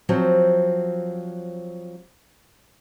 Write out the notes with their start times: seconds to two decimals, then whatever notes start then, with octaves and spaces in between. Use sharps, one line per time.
0.09 F3 F#3 C4